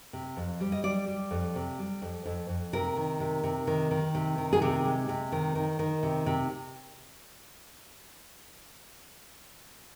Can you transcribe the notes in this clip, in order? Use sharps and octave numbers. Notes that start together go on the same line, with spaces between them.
C3
F2
G3
D#5
G3 D5
G3
F2
C3
G3
F2
F2
F2
C3 A#4
D#3
C3
C3
D#3
D#3
C3
D#3
G#4
C3 G4
G#3
C3
D#3
D#3
D#3
C3
C3